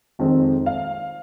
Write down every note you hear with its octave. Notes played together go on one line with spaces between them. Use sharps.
F2 D#3 G#3 C4
F5